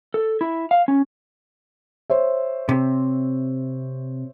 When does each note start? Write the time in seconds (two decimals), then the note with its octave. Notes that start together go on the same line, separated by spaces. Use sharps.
0.14 A4
0.41 E4
0.71 F5
0.88 C#4
2.10 C5 C#5 E5
2.69 C3